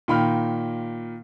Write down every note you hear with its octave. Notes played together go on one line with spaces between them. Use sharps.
A#2 D#3 G5 B5 F6